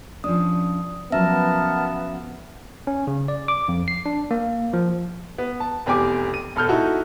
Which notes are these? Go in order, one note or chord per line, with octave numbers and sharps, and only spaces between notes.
F3 C#4 D4 D#6
F3 F#3 B3 C#4 A#4 E5 A5
C#4
C#3
D5
D6
F2
C7
D4
A#3
F3
B3
A5
F1 E2 G4 G#5 D6
D#7
E1 A4 F6 G6
D#4 E4 F#4 A4